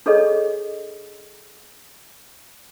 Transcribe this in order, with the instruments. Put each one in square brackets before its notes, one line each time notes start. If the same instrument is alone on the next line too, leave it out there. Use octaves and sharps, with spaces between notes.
[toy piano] D4 G#4 A4 C#5 D#5